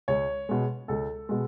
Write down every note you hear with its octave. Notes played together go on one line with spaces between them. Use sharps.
C#2 C#5
B2 G#3
C#2 A4
B2 G#3